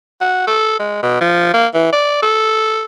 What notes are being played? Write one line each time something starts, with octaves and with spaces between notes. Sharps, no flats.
F#4
A4
G#3
B2
F3
A#3
E3
D5
A4